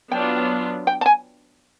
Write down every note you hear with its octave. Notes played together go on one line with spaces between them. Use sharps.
F#3 B3 D4 F4 G5
G5
A5
G#5